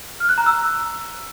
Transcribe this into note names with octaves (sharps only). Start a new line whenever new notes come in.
F6
F#6
A#5
E6